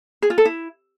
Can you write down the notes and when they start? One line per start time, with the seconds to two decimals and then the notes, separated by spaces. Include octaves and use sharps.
0.22 G#4
0.30 F4
0.38 A4
0.45 E4